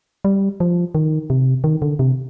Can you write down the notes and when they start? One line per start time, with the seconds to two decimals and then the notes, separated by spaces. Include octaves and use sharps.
0.25 G3
0.60 F3
0.95 D#3
1.30 C3
1.64 D#3
1.82 D3
1.99 C3